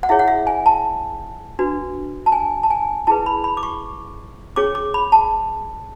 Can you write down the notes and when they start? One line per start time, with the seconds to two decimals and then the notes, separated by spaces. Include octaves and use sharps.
0.03 F#5
0.09 E4 G#4 C#5 E5
0.19 F#5
0.28 E5
0.47 G#5
0.66 A5
1.59 D4 F#4 B4
2.26 A5
2.32 G#5
2.63 A5
2.71 G#5
3.07 E4 G#4 B4 A5
3.26 B5
3.44 B5
3.57 D6
3.63 C#6
4.56 C#4 G#4 C#5 D6
4.75 D6
4.94 B5
5.12 A5